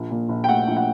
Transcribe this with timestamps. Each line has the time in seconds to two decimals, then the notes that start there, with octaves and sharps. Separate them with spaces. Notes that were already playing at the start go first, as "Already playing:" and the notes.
Already playing: A#1
0.11 A#2
0.29 A#1
0.44 G5
0.49 A3 F#5
0.67 A#1
0.77 F#5